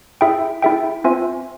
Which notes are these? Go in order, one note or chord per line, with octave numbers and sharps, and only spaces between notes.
E4 G#4 E5 G5
E4 G#4 E5 G5
C4 F4 C5 E5 G#5